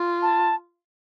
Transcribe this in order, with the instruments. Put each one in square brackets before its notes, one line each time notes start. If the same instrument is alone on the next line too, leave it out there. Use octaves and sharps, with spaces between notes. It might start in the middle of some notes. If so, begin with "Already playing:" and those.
Already playing: [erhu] F4
[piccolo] A5